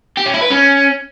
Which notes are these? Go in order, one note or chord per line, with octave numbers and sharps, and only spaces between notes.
G4
C#4
E4
B4
C#4